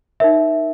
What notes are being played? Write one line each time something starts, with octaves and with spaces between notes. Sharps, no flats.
D#4 A#4 C#5 E5